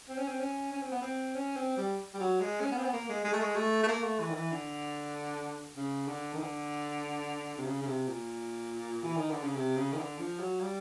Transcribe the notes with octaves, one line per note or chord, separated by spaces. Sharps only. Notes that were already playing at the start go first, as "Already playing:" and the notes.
C4
C#4
C4
C#4
C#4
C4
B3
C4
C#4
C4
G3
G3
F#3
G#3
C#4
B3
C4
B3
A#3
G#3
G#3
A3
G#3
A3
A3
A#3
A3
E3
D#3
E3
D3
C#3
D3
D#3
D3
C3
C#3
C#3
C3
A#2
E3
D#3
D3
C#3
C3
C#3
D#3
D3
F3
F#3
G3